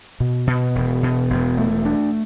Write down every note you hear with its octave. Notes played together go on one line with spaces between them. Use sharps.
B2
B2
E1
B2
E1
A3
D4